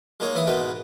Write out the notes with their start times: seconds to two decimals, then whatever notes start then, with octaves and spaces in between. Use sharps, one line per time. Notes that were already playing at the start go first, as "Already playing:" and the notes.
0.20 G#3 A#3 D#4 G#4 C#5
0.35 E3 E4 F5 D#6
0.47 G#2 B2 G#3 A#3 B4 G5